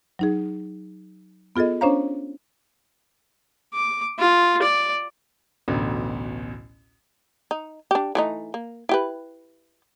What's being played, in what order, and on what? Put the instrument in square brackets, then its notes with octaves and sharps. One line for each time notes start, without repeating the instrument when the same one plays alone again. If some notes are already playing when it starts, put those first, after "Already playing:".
[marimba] F#3 D#4 G#4
B3 F4 G#4 A4 D#5
C#4 D4 C5 C#5 F5 A#5
[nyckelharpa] D6
F4
D5
[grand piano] A1 D2 B2
[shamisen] D#4
D4 G4
E3 A3 D#4
A#3
E4 G4 B4